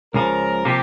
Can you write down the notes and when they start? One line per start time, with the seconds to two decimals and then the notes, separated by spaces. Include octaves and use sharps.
0.14 C#2 C#3 F3 A#4
0.65 C3 F3 A#3 G4